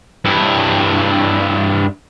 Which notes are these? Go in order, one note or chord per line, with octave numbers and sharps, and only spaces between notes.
G2 E4